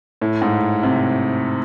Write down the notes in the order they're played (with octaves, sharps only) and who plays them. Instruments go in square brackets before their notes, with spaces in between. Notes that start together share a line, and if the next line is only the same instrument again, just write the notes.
[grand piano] A2
G#2
C3